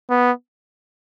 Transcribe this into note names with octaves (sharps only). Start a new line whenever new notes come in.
B3